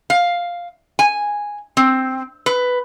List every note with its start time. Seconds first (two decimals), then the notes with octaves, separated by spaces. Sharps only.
0.10 F5
0.99 G#5
1.77 C4
2.46 B4